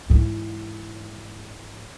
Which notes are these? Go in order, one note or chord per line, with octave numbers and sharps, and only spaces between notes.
G#2 E3